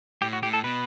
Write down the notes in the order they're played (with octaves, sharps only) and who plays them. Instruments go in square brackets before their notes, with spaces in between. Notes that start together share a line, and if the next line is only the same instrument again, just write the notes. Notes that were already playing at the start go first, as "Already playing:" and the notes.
[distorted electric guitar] A2 [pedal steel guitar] G4
[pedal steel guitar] F#4
[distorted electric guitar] A2 [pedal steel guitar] G4
[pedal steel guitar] A4
[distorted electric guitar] B2 [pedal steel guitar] B4